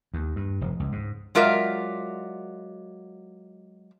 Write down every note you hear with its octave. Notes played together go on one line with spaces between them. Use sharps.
D#2
G2
F1
C#2
G#2
F#3 G#3 F4 A#4 D5 E5